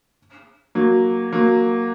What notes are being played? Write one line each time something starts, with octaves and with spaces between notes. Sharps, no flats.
F#3 A#3
F#3 A#3